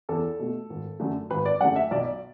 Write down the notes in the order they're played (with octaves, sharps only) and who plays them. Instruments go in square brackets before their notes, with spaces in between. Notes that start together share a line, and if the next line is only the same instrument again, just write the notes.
[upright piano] E2 A4
B2 A3
G#1
F#2 D3 A3
G#1 B4
D5
F#2 D3 A3 F#5
E5
B1 D5